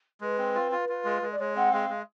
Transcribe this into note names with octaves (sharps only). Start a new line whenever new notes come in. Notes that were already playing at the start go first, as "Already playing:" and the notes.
G#3 B4
C4
F4
F4
F4
G#3
G#3
D5
G#3 C#5
C4 F#5
G#3 F5
G#3